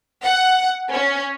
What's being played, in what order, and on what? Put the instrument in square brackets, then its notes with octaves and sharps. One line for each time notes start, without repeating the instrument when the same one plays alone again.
[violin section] F#5
C#4